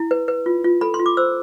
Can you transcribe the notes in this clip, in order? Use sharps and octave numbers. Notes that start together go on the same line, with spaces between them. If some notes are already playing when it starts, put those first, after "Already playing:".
Already playing: E4
B4
B4
F4
F4
A4 B5
C6
F4
D6
C5 E6